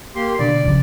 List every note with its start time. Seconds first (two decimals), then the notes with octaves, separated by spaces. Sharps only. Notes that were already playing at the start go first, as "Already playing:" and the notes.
0.15 A#3 G4 C6
0.39 B2 D3 D5
0.64 C#3 F3